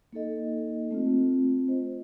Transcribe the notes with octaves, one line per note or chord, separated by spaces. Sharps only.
A#3 D#4 A4 D#5
A3 C4 F4
F4 C5 D#5